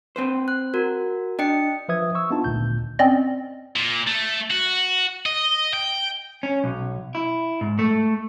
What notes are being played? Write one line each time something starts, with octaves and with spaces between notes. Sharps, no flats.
C4 B4 C5
F#6
F#4 A#4
D4 D#5 G5 C#7
F3 B4 E5 D#6 G#6
C#6 E6
B3 D4 D#4 F4 A5
G#1 D2 A#2 G6
C4 C#4 D5 D#5
A#2
A3
F#4
D#5
G5
C#4
B1
E4
G#2
A3